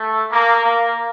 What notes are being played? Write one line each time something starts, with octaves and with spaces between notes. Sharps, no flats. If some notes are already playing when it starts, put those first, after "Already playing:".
Already playing: A3
A#3
A#3